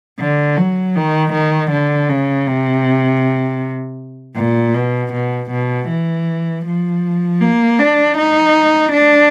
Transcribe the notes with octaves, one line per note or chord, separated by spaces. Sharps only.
D3
F#3
D#3
D#3
D3
C#3
C3
A#2
B2
B2
B2
E3
F3
A#3
D4
D#4
D4